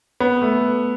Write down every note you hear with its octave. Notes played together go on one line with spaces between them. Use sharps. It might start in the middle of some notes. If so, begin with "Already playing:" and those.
B3
A3